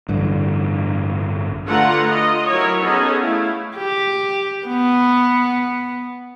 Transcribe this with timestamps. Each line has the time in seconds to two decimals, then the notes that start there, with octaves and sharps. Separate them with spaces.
0.09 A1 G2 D3
1.67 D3 A3 F4 B4 F#5 A#5
2.11 F4 D#5
2.50 F#3 E4 A#4 C#5
2.81 B3 C#4 D#4 G#4 A4 D#5
3.20 A3 E4 F5
3.77 G4
4.67 B3